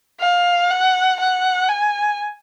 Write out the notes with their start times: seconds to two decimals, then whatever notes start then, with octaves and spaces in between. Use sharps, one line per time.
0.20 F5
0.71 F#5
1.20 F#5
1.69 G#5